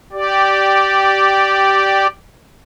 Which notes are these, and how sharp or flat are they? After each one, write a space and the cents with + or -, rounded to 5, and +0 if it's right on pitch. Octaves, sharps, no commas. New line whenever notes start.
G4 -10 D5 +0